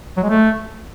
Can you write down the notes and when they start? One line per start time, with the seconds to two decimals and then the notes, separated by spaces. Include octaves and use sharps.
0.17 F#3
0.23 G#3
0.30 A3